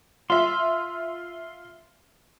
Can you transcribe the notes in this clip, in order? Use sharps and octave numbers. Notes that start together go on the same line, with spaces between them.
F4 E5 C6